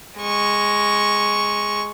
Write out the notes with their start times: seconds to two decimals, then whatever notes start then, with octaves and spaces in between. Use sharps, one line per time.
0.17 G#3 C#6